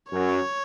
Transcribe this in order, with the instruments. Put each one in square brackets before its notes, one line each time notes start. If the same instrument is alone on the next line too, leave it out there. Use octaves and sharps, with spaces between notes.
[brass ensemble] F#2 [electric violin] C#5